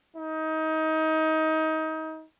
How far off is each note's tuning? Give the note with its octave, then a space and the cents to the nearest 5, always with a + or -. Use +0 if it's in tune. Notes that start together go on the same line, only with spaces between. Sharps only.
D#4 +25